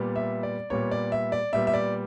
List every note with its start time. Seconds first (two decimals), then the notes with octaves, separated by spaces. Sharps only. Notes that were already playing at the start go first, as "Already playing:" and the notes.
Already playing: A#2 G3 B3
0.16 E5
0.43 D5
0.70 A#2 G3 B3 C#5
0.91 D5
1.12 E5
1.32 D5
1.53 A#2 G3 B3 E5
1.67 E5
1.74 D5